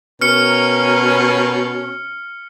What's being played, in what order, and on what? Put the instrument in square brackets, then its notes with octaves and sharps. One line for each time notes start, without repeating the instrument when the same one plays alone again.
[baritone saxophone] B2 [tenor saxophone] C#4 [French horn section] A#4 [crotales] F6 C#7